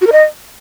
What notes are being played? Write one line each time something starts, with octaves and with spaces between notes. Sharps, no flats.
F#4
A#4
D#5